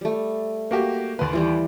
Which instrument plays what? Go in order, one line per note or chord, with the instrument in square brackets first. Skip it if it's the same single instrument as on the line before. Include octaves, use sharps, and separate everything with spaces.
[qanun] G3 A3
[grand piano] A#3 F#4 G4
[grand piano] D#2 B4 [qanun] D5 C6
[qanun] E3 G3 G5